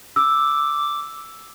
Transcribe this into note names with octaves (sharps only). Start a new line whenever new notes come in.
D6 E6